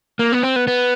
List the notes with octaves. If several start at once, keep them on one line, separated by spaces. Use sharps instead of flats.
A#3
B3
C4
B3
B3